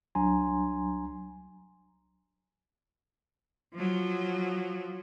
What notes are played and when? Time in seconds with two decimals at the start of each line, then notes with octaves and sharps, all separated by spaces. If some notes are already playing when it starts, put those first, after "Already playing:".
0.15 C2 F#3 D4 G#5 A#5 C6
3.74 F3 F#3